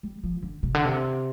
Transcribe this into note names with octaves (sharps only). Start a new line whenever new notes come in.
G3
F3
D3
C3
D3
C3